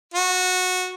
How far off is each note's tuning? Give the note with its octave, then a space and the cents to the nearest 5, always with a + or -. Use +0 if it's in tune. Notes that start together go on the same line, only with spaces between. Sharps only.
F#4 -15